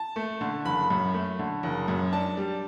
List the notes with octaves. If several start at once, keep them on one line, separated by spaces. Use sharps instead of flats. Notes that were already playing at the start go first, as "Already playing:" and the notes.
Already playing: A5
A3
D3
F#1 B5
F#2
A3
D3
F#1
F#2
D4 A5
G3